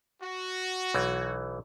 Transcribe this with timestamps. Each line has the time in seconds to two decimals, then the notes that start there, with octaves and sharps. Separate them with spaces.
0.20 F#4
0.94 B1 E3